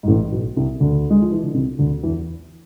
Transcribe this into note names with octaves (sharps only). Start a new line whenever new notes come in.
G#2
A1 A2
B1 B2
C2 C3
D2 D3
G#3
F3
E3
D3
C2 C3
D2 D3
E2 E3